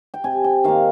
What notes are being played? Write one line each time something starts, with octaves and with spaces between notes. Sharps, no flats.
G5
C3 G#5
G5
D#3 A#3 F5